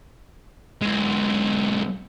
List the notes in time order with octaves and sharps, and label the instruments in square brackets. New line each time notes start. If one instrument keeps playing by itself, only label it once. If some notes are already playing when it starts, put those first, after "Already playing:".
[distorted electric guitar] B1 G#3